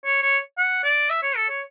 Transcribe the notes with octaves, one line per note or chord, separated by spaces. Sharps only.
C#5
C#5
F#5
D5
E5
C#5
A4
C#5